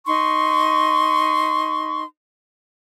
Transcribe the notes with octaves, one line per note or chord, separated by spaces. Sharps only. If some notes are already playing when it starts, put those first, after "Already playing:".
D#4 C6 C#6